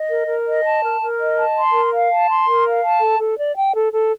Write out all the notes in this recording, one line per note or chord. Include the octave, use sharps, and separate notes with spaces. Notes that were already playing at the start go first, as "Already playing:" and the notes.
Already playing: D#5
A#4
A#4
D#5
A5
A#4
A#4
D#5
A5
C6
A#4
F5
A5
C6
A#4
F5
A5
A4
A4
D5
G5
A4
A4